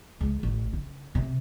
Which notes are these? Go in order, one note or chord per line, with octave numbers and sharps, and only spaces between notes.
C#2
A1
C#3
C3